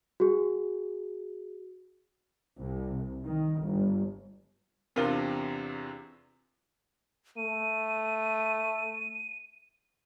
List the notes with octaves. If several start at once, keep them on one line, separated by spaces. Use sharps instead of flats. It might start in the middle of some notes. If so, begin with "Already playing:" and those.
F#4 G#4
C2
D#3
G1
E2 C3 C4 D4 F4 A#4
A3 D#7